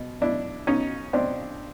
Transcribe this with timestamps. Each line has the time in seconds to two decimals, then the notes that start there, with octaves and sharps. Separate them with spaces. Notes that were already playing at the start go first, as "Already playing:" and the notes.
Already playing: B2
0.21 B2 D4 E4
0.67 B2 C#4 D#4
1.13 B2 C4 D4